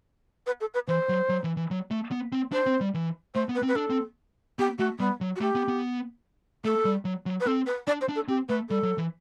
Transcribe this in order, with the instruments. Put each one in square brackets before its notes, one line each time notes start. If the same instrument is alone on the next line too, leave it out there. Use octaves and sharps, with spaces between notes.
[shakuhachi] B4
A4
B4
[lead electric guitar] E3 [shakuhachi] C5
[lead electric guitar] F#3
F#3
E3
E3
F#3
A3
B3
C4
[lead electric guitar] D4 [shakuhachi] C5
[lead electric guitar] C4
G3
E3
[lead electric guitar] A3 [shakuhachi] C5
[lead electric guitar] B3
[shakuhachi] B4
[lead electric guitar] C4
[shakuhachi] B4
[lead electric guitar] D4 [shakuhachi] A4
[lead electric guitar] C4
[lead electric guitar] B3 [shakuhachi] G4
[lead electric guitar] A3 [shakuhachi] F#4
[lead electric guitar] G3 [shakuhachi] B3
[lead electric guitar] F#3
[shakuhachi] F#4
[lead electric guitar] A3 [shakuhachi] G4
[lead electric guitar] B3
B3
[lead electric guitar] A3 [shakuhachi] A4
[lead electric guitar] G3
F#3
F#3
[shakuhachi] B4
[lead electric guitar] C4 [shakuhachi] A4
[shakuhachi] B4
[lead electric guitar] D4 [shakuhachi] D5
[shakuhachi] C5
[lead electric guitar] D4
[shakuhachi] A4
[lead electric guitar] C4 [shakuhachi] G4
[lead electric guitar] A3 [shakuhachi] B4
[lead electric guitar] G3 [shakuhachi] A4
[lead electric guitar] F#3
E3